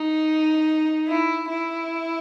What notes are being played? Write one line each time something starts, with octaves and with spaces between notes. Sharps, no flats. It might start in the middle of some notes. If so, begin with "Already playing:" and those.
Already playing: D#4
E4
E4